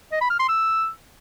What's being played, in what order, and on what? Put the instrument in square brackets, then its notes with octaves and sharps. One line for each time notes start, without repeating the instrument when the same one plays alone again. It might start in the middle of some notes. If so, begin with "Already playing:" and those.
[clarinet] D#5
B5
F6
C6
E6